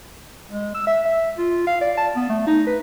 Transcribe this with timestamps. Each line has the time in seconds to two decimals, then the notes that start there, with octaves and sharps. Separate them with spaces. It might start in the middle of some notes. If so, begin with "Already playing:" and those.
0.52 G#3
0.75 E6
0.87 E5
1.06 E5
1.38 F4
1.67 F5
1.81 D5
1.98 A5
2.16 B3
2.30 A3
2.47 D#4
2.67 B4